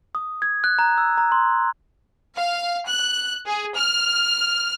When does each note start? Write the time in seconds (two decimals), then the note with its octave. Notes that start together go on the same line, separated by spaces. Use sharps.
0.15 D#6
0.42 G#6
0.64 F#6
0.79 A#5
0.98 E6
1.17 A#5
1.32 C6
2.37 F5
2.89 F#6
3.46 G#4
3.75 F6